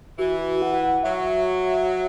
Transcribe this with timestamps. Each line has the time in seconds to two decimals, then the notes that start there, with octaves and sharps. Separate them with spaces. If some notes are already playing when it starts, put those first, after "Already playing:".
0.19 E3 F#4
0.40 F#4
0.62 F#5
0.82 F#5
1.03 F#3 E5